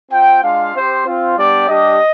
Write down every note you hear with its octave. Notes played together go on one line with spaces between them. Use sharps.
C4 F4 G5
G#3 D4 F4 F5
C4 G4 C5
C4 F4
G3 B3 D4 G4 D5
G3 D4 G4 D#5